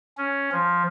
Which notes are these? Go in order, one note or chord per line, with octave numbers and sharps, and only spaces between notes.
C#4
F3